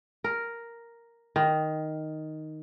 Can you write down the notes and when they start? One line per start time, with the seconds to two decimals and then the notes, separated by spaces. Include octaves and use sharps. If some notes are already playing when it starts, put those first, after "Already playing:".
0.24 A#4
1.36 D#3